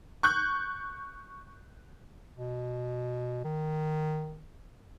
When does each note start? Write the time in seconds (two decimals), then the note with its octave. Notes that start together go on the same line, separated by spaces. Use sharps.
0.23 C#6 F#6 G6
2.37 B2
3.44 D#3